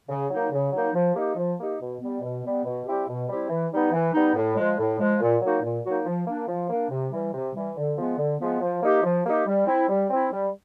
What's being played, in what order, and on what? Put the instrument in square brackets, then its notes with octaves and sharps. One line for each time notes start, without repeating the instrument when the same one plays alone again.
[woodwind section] C#3
F#3 A#3 D#4
C#3
F#3 A#3 D#4
F3
A#3 D#4 G4
F3
A#3 D#4 G4
B2
G3 B3
B2
G3 B3
B2
G3 C4 E4 G4
B2
G3 C4 E4 G4
E3
G3 B3 D#4
E3
G3 B3 D#4
A2
F3 G#3
A2
F3 G#3
A#2
F#3 A#3 D#4 F#4
A#2
F#3 A#3 D#4 F#4
F3
A#3 D4
F3
A#3 D4
C3
E3 G3
C3
E3 G3
D3
F3 G#3 B3
D3
F3 G#3 B3
F3
A#3 D#4 G4
F3
A#3 D#4 G4
G3
C4 E4
G3
C4 E4
G3